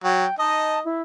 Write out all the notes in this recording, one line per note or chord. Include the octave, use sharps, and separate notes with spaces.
F#3 G5
D#4 D#5 A5
E4